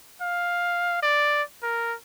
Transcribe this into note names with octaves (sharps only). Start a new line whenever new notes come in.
F5
D5
A#4